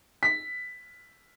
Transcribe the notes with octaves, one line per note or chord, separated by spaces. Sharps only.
B6